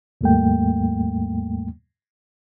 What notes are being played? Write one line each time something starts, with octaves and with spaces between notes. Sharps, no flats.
D#2 G#2 G3 A3 A#3 G5